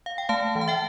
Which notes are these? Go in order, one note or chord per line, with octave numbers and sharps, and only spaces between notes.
F5
G5
A3 F5 A5
E3
A5
E5 G5